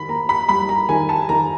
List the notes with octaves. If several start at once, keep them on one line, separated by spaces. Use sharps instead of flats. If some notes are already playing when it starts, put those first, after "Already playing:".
Already playing: D#3 B5
A#3 A#5
B5
G3 B5
A#5
D#3 G#5
A5
D#3 A#5